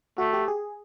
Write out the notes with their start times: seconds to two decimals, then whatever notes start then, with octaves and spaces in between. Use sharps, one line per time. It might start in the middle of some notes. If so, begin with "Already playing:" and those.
0.18 A3 F#4
0.33 G4
0.48 G#4